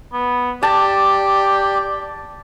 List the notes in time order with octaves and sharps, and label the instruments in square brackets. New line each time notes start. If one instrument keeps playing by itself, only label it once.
[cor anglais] B3
[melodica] G4 [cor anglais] D5 [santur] A5